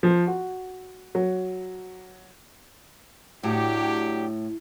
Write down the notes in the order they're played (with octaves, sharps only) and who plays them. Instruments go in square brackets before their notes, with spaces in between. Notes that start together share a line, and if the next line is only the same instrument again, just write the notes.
[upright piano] F3
F#4
F#3
[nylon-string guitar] A2 [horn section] F#3 D4 G4